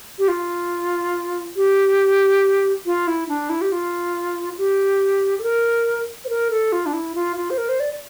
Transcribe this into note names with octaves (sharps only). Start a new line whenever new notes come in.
G4
F4
G4
F4
E4
D4
E4
G4
F4
G4
A4
A#4
C5
A#4
A4
F4
D4
E4
F4
F4
C5
A#4
C5
D5